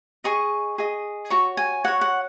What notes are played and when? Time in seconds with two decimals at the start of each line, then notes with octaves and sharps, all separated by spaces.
0.24 G#4 D#5 C#6
0.78 G#4 D#5
1.30 F#4 C#5 C#6
1.57 G#5
1.84 F#4 C#5 F#5
2.01 F#5